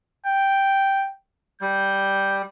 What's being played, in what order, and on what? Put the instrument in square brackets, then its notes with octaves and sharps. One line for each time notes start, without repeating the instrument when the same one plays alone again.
[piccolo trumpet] G5
[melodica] G3 [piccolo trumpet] G6